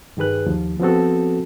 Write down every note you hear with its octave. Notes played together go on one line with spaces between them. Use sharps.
G2 D#3 G#4 B4 F#6
D#2 F3
F3 B3 C4 F#4 A4